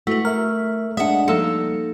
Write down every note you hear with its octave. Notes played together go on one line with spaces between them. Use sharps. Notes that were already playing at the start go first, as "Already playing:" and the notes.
A3 E4 F#4 B4
A#4 E5 F6
G#3 D4 E5 F#5 D#6
F3 G3 A#3 D#4 A4 E6 C#7